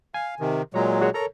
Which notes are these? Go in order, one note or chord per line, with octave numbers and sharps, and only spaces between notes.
F5 G#5
C3 D#3
A#2 F#3 G#3 C#5 A#5
F#4 G#4 C#5
A4 A#4 C#5 A#5